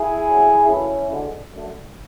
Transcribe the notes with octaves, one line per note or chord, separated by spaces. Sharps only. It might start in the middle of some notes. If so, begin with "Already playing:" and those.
Already playing: E4 G#4
E2 D3 F#3
F#2 C#3 E3 A3 C#4 E4
D2 D3 G#3
F#2 D3 A3